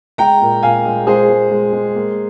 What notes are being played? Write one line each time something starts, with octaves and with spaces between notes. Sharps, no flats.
G#3 G5 A#5
A#2
A#2 F5 G#5
G#3
G#3 G#4 C5
G#3
G#3
G#3
A#3